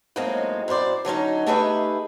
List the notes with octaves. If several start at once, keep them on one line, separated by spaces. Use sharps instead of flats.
A2 F#3 G#3 A#3 C4 D#4
F#2 E4 C5 D5
D3 F#3 C#4 D#4
A3 D#4 G4 G#4 B4 E5